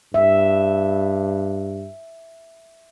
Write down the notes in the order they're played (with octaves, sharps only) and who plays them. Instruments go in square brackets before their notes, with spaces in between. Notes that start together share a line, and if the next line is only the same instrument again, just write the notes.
[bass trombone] G2 [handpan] E5